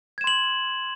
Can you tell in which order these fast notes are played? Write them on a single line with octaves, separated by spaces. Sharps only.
G#6 E7 C6 F#7